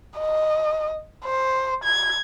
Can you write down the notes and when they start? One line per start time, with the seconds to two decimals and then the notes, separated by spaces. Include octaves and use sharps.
0.19 D#5
1.24 C5
1.84 G#6